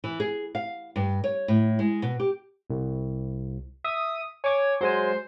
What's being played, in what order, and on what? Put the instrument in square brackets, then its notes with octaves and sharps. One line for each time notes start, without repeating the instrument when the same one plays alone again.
[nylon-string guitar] E3
G#4
F5
G2
C#5
A2
G#3
B2
G4
[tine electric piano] C2
[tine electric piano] E5 [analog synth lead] D#6
[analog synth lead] C#5 [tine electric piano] G#5 D6 G#6
[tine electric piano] F#3 G#3 G#5 [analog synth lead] C5